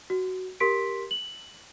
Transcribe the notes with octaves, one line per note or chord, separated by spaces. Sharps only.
F#4
G4 A#4 C6 B6 D7
F#7